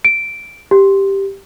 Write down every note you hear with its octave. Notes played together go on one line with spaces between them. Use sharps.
D7
G4